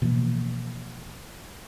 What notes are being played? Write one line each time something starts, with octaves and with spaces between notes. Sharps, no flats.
B2 E3 F3 A#3